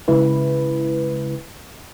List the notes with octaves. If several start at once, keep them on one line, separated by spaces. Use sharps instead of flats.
C#3 G#3 E4 B4